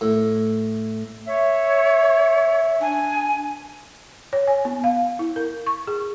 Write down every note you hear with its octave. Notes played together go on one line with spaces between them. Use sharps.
A2
C#5 E5
D4 G#5
C#5
G#5
B3
F5
E4
A#4
C#6
G#4